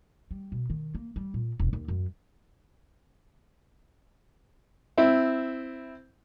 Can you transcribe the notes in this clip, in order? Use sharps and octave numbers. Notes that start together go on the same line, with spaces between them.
G3
B2
D#3
A#3
G3
A#2
E1
D#2
F#2
C4 E4